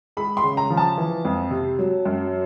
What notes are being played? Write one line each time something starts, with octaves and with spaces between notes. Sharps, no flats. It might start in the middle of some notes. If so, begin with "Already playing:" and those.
G#3 B5
C6
C#3
A#5
F3
A5
E3
F2
C3
F#3
F#2